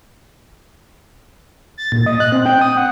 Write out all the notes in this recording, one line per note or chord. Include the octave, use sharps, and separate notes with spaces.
A6
A#2
D#5
F#6
C4
G5
D#6
F#5